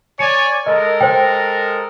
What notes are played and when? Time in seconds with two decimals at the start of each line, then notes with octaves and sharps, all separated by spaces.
0.19 C#5 D5 G#5 C#7
0.67 G#3 A4 A#4 D#5
1.01 C5 G5